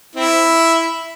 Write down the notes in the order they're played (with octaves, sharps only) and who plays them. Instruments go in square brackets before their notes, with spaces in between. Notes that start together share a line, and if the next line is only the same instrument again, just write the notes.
[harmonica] C4 E4